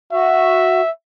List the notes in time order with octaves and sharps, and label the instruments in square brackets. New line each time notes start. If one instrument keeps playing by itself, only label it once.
[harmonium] F#4 [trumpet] E5